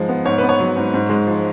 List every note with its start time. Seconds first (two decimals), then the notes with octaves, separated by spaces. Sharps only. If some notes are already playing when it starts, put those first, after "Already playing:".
Already playing: G#2 F3 G#3
0.09 B3
0.25 G#2 C#5
0.38 B3 B4
0.49 C#5
0.60 F#3
0.77 G#2
0.94 G#2
1.10 G#3
1.27 F3